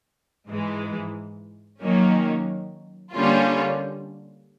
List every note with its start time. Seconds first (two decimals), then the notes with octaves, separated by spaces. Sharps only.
0.49 G#2 E3 G#3
1.81 D#3 F#3 A#3 C#4
3.13 D3 G3 A#3 C#4 F4